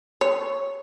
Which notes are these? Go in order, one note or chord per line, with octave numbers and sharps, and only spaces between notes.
C#5